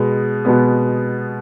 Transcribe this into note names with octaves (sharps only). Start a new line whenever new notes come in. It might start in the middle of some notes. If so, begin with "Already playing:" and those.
Already playing: B2 G#3 B3
B2 G#3 B3